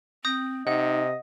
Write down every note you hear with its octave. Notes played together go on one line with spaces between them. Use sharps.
C4 D#6 G6 A#6
C3 D#4 D#5 F#5